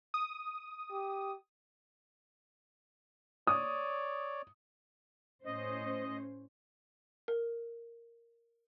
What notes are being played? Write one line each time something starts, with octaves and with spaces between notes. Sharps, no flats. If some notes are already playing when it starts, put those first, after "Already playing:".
D#6
G4
C#5 D5 D#6
A2 C#4 C5 D#5
A#4